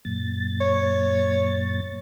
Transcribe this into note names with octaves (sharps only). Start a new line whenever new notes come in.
F#2 A#2 A6
C#5